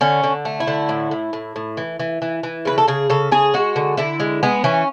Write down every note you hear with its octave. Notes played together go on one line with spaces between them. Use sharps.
D3 C#4
D3
A3
E4
D3
A2
A2
A2
A2
E3
E3
E3
E3
C#3 B4
A4
C#3 G#4
C#3 A4
C#3 G#4
G#3 F#4
D3
D3 E4
G#3
G#3 B3
E3 C#4